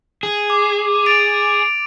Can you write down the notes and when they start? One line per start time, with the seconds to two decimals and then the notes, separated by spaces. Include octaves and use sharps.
0.23 G#4
0.50 D6
1.06 A6 D7 F7